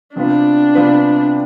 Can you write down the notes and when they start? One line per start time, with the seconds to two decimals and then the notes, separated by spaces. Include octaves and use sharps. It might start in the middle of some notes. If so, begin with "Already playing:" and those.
0.16 C3 G3 B3 D4 F4 B4
0.75 C3 G3 B3 F4 B4